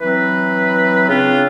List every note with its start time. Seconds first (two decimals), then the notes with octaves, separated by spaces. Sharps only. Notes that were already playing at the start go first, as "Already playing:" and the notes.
0.01 E3 F#3 C4 B4
1.09 C#3 C4 D4 F4